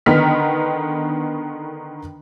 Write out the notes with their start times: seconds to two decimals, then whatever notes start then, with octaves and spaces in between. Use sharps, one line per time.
0.06 D3 D#3 B3 F6 B6